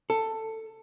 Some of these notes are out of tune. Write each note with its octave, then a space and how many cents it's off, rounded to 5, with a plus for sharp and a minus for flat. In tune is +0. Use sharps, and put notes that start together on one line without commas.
A4 +15